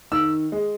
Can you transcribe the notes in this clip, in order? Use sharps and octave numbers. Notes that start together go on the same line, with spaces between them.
D#3 E6
G#3